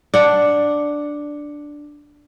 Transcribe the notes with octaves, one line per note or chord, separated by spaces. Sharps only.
D4 F#5